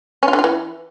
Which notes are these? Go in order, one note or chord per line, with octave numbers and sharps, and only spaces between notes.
C#4
F4
D3
F4
E3